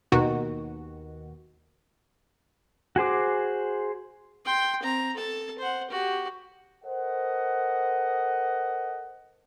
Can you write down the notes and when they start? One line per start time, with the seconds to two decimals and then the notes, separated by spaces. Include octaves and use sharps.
0.12 D#2 B2 D#3 F#4
2.96 F#4 G#4 C5 D6
4.45 G5 C6
4.83 C4 A#5
5.16 A4 A5
5.59 C5 F#5
5.90 F#4 G4
6.84 A4 A#4 C5 D#5 F#5